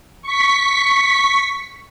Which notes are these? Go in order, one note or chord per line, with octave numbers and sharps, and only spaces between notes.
C#6 B6